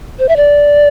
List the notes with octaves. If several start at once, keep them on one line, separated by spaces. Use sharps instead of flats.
C5
E5
D5